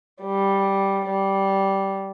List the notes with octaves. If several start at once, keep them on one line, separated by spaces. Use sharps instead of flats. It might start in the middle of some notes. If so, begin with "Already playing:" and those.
G3
G3